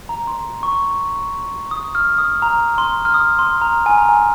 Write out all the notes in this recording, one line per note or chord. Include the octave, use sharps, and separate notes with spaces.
A#5
C6
C#6
D#6
F6
D#6
A#5
C6
F6
D#6
C6
A#5
G#5
A#5
G#5